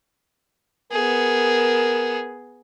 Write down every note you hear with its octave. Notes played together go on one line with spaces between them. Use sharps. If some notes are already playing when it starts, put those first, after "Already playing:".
B3 G#4 A#4